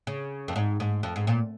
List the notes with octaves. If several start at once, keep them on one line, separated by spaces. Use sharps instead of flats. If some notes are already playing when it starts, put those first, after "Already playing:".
C#3
F2
G#2
G#2
F2
G#2
A#2